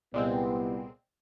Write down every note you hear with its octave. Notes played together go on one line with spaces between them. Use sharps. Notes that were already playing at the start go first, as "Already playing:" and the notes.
C2 A#2 G3 G#3 B3 C4